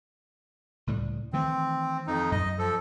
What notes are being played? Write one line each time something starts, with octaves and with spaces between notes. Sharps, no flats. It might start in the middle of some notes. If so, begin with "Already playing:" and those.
C#2 A2 G3
D#3 E3 A3 C4
F2 D#4
F#2 D#5
F3 A4